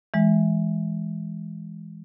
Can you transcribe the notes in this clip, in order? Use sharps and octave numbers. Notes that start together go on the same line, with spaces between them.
E3 G#3